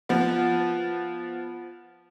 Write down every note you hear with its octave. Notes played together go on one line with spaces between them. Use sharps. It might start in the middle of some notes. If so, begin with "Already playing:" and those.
F3 B3